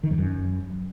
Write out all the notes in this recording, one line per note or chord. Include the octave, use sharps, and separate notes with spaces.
D#3
F2
F#2